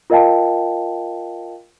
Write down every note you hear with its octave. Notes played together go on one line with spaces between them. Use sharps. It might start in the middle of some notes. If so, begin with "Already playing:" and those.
F4 A#4 D#5 F5 G5 A5